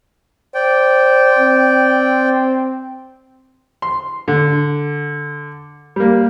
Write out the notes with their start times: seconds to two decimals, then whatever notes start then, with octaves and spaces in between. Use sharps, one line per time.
0.55 C5 D5 G5
1.39 C4
3.82 C6
4.28 D3
5.96 G3 A#3